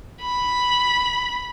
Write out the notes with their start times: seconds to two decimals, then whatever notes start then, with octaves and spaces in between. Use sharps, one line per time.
0.21 B5